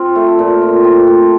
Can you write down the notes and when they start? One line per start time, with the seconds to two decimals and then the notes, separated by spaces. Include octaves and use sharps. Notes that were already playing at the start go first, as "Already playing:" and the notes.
Already playing: C4 F4
0.16 A3
0.39 A#2
0.62 F4
0.84 C4
1.07 A3